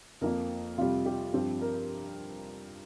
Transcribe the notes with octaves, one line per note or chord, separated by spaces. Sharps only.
F2 F3 A#3 A#4
F2 C3 G3 F4
G4
G2 F3 C4 G4
A#4